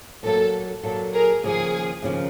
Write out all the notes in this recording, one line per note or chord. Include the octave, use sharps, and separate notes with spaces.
A#2 F#3 A#3 A4
A#2 F#3 A#3 A4
G#4 A#4
D#2 C#3 F3 A#3 G#4
D#2 C#3 F3 A#3